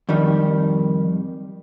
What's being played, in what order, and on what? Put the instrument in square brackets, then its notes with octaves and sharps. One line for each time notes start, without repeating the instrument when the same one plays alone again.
[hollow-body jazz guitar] F2 D#3 G3